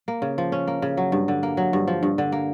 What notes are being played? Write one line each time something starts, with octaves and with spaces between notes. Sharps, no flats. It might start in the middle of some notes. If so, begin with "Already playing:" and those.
A#3
C#3
F3
C#4
A#3
C#3
F#3
G2
D3
A#3
F#3
G2
F3
G2
D3
A#3